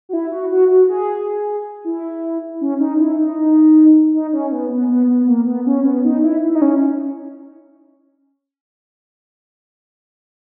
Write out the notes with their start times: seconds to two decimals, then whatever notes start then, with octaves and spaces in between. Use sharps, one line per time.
0.09 F#4
0.13 E4
0.32 F#4
0.51 F#4
0.70 F#4
0.89 G#4
1.85 E4
2.61 C#4
2.80 D#4
2.99 E4
3.18 D#4
4.13 D#4
4.33 C#4
4.52 B3
4.71 B3
4.89 B3
5.09 B3
5.28 A#3
5.47 B3
5.66 C#4
5.85 B3
6.05 D#4
6.23 E4
6.42 E4
6.55 D#4
6.62 C#4